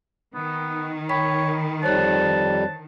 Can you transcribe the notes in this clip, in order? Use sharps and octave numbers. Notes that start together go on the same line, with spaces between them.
D#3 B3
C#5 G5 B5 B6
F2 G3 C5 C#5 A5 F#6